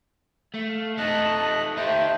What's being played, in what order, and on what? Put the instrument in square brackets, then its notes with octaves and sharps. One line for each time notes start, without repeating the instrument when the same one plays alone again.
[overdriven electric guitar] A3
[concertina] F5
[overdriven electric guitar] A3 D#4 [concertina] D#5 F#6 [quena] A5
[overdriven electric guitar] D#4 G4 [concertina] C5 A5 [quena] E5